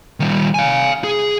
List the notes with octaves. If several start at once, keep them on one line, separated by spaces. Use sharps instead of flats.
D#3 G3
F5 G#5
G#4